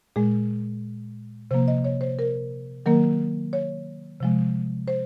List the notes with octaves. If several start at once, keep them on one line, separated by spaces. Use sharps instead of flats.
A#2 G#3 G#4
C3 F3 A#3 C5
D#5
C#5
C5
A#4
D#3 F#3 A#3 A#4
C#5
C3 F3 G#3
C5